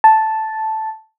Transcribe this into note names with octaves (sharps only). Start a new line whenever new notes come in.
A5